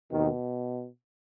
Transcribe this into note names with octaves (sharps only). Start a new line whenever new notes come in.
D#2 B2 D#3